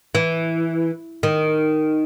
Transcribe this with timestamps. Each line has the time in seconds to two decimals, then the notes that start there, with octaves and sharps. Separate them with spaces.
0.15 E3
1.23 D#3